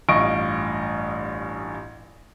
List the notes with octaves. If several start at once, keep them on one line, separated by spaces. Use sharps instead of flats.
A1 G2 F4 D#5 C#6 D7